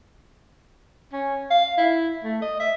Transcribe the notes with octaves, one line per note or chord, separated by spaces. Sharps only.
C#4
F5
E4
A3
D#5
E5